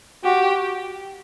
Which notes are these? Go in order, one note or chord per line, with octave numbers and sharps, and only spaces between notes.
F#4 G4